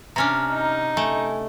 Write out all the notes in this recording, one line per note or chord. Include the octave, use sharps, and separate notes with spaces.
C3 C#4 D4 A#5 F6
D#4
A3 G#5